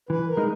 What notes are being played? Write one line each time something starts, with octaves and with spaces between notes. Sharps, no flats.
E3 B4
A#4
G#3 D#4